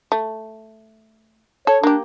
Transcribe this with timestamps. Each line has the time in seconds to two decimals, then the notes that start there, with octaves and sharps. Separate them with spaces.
0.12 A3
1.67 A4 C#5
1.83 A#3 D4 G4